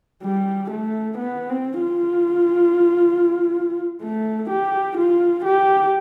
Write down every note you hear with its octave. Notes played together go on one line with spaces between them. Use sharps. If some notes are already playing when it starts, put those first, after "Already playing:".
G3
A3
B3
C4
F4
A3
G4
F4
G4